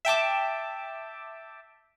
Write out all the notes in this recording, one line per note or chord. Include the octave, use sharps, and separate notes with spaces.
E5 G5 A5 D6